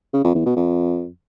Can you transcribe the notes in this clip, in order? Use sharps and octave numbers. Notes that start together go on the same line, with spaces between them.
C#3
F2
E2
B2
F2